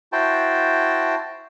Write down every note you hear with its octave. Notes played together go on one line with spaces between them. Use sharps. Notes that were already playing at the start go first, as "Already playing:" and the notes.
E4 F#4 C5 G5 A5